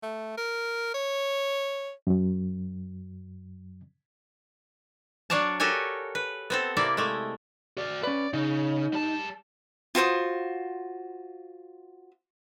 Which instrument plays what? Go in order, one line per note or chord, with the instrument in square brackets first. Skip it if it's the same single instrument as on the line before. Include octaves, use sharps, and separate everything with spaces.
[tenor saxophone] A3
A#4
C#5
[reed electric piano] F#2 F#3
[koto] F#3 D4 C#5 D5 F5 A5
F#4 G4 A4 A#4 C#5 G#5
B4
B3 C4 A4
C3 A#3 E4 D5
G#3 A3
[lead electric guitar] F#4 D5
[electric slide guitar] C#4 B4 [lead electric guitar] D5
[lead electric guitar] C#3 [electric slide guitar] D#4
[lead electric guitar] G3 A5
[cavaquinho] F4 F#4 C5 D#6